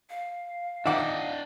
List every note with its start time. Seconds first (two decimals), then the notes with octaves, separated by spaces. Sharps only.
0.10 F5
0.86 D#3 D4 D#5 E5 F#5 D6